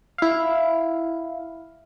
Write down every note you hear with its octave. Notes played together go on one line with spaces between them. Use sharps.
E4 F5